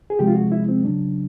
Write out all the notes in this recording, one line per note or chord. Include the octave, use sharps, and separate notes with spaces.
G#4
C3 F3 G#3 G4
F4
F#4
E4
C4
C#3 F#3 D4